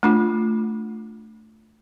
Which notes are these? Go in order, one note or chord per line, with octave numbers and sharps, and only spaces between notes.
A3 D4 F4